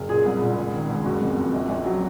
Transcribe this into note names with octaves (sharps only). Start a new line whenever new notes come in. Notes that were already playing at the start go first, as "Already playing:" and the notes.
Already playing: F#1
A#2 G#4
C2
A#2
C#2
D#3
C#2
F#1 F#4
F2
F2
A#1
A#1
F#3